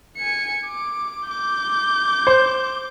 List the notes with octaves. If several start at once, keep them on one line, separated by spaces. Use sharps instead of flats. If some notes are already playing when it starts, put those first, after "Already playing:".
G#5 C#7
D6
D6 G6
C5